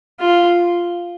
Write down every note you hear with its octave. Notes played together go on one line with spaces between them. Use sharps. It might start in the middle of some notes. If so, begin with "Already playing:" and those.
F4